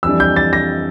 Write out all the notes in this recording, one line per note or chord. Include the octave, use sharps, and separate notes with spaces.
F2 E3 G3 D4 E6
G6
A6
A#6